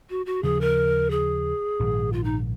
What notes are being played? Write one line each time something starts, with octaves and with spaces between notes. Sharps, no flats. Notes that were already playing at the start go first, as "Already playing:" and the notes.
F#4
F#4
D#2 C#3 F3 G#4
A#4
G#4
A#1 G#2 D#3
F4
D#4